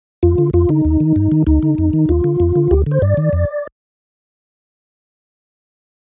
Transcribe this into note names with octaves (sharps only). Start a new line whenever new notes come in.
F2 F4
D3
F2 F4
D3 D#4
D#2
D#3
G2
D#3
D2 D#4
D3
F2
D#3
D#2 F4
D3
F2
D3
D2 G4
D3 C5
G2 D5
D#3
F2